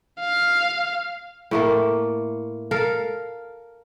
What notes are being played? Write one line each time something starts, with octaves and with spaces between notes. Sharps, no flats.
F5
A2 A3 A#3
A4 A#4 F5